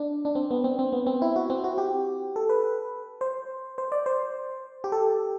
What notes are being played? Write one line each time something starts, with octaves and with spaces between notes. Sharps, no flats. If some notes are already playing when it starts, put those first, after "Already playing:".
Already playing: D4
D4
C4
B3
C4
C4
B3
C4
E4
F#4
C4
F#4
G4
A4
B4
C5
C5
D5
C5
G4
A4